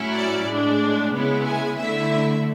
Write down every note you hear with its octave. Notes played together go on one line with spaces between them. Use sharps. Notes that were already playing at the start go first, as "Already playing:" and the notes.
Already playing: A2 F#3 C#4 E4
D5
A2 G#3 D4
C#3 G#3 B3 E4
G#5
D3 A3 E4 E5